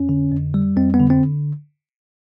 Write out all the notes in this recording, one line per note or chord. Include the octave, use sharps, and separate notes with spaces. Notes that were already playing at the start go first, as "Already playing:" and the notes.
Already playing: F2 C#4
D3
F2
G3
F2 C4
B3
D3
C4